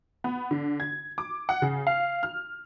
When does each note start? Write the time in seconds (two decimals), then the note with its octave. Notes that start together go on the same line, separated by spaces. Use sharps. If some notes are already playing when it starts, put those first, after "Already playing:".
0.24 B3
0.51 D3
0.80 G#6
1.18 D6
1.49 F#5
1.62 C#3
1.87 F5
2.23 F6